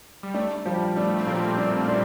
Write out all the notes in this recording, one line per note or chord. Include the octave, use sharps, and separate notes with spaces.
G3
A3 D4
F3 G3
A3 D4
C4
A#2 F3 A#3
D4
D4